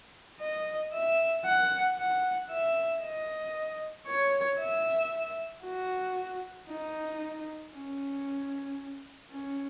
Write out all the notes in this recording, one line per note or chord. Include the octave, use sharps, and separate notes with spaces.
D#5
E5
F#5
F#5
E5
D#5
C#5
E5
F#4
D#4
C#4
C#4